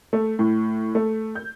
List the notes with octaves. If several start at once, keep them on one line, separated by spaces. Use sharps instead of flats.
A3
A2
A3
G6